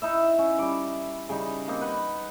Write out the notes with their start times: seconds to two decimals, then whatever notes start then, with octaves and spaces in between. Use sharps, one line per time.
0.02 D#4 E4 E5
0.39 C#4
0.58 G3 D6
1.29 C#3 G3 D#4
1.68 A#3 C4 D#4
1.81 B4 F#5